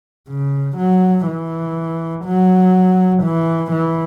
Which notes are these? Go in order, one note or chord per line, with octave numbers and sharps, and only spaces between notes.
C#3
F#3
E3
F#3
E3
E3